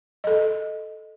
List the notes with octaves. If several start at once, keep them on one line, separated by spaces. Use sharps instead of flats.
A4 D#5